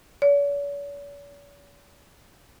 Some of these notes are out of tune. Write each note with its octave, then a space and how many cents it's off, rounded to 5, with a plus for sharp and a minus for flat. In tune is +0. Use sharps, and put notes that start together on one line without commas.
C#5 +45